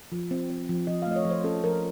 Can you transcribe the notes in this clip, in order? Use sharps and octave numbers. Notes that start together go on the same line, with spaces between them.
F3
C4
C4
F3
F3 D#5
F5
A3 D#5
C#5
F3
C5
C#4 A4
F3 A#4